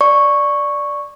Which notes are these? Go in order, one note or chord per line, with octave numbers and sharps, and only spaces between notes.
D5 C#6